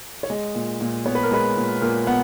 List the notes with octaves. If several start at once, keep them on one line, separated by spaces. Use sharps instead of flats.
C#5
G#3 D#5
A#2
A#2
B3 C#5
B4
A#4
G#3 B4
A#2
A#2 A#4
B3 F#5